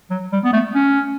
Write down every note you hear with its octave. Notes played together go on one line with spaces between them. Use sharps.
F#3
G3
B3
A3
C#4